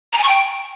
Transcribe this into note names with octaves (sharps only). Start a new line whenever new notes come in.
A#5
G#5
C#6
G5